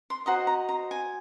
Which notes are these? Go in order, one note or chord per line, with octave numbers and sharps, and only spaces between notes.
C6
F#4 C5 D#5 A#5
A#5
A#5
G#5